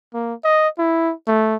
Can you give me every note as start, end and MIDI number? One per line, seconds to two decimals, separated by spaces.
0.14 0.34 58
0.44 0.69 75
0.79 1.13 64
1.28 1.56 57